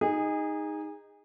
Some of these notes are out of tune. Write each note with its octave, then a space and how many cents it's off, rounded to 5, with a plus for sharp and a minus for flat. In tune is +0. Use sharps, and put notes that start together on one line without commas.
D#4 +0 G#4 -25